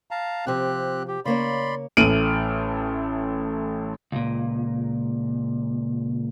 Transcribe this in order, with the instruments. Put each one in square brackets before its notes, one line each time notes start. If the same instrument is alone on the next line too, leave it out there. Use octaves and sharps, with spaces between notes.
[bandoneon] F5 A5 A#5
[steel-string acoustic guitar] C3 F3 [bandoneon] C4 G4 F#6
[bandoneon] G4
[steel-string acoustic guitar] C#3 A#3 C#5 [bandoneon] D5 B5 C6
[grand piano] A1 A3 F6 D7 D#7 F#7
[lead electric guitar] C#2 A#2